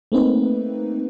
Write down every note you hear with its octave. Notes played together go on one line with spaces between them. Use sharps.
A3 A#3 C4 D#4 B4